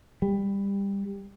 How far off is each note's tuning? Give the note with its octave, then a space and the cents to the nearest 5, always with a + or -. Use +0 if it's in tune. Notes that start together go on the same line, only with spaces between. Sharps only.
G3 +20